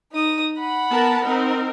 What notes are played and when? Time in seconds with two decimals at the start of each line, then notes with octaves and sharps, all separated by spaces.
0.12 D#4 D#6
0.57 F#5 B5
0.89 B3 A#4 A5
1.24 C4 D#4 A#4